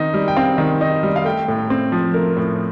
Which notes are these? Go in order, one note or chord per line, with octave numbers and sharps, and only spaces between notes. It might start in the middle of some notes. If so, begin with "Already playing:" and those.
Already playing: D#3 C4 D#4
G3
G5
C4 F5
D#3
D#4
G3
F5
A3 G5
A2
C4
F3
A3 A#4
A2